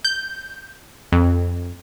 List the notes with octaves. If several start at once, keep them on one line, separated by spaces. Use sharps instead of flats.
G6
F2